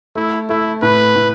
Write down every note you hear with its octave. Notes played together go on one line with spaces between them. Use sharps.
A3 E4
A3 E4
A2 B4
A2